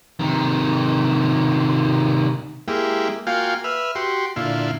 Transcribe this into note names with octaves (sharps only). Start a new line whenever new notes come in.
C3 D#3
G#3 A#3 E4 G4
A#3 F4 F#4 F5 G5 G#5
B4 E5 F6
F#4 G4 C6
A#2 D3 E4 F4